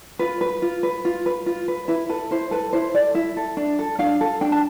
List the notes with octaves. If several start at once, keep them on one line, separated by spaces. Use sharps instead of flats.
F4 B4
B4
F4
B4
F4
B4
F4
B4
E4 B4
A4 B4
E4 C5
A4 B4
E4 C5
A4 D5
E4 E5
A4
D4
A4
D4 F5
A4
D4 G5
A5